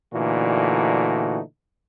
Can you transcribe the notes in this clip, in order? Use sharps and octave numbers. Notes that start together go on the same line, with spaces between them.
A#2 D3 E3 A3 D#4 F#4